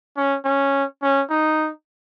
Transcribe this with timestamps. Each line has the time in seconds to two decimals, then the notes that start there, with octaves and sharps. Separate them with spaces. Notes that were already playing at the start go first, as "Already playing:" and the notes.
0.17 C#4
0.45 C#4
1.02 C#4
1.30 D#4